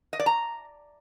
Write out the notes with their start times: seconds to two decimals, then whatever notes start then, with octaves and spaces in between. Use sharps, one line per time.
0.13 D#5
0.20 D5
0.26 A#5